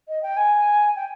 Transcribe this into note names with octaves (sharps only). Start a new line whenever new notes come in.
D#5
G5
G#5
G5